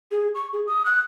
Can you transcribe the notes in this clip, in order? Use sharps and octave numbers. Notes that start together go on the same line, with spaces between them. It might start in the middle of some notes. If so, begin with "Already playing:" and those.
G#4
C#6
G#4
D#6
F#6